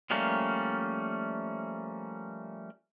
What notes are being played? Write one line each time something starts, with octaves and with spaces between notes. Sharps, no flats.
F3 G3 A3 A#3 C#4